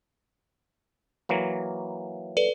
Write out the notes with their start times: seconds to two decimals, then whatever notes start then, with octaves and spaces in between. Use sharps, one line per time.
1.29 E3 F#3 A#3
2.37 A4 B4 D5